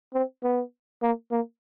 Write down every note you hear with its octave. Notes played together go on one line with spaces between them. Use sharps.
C4
B3
A#3
A#3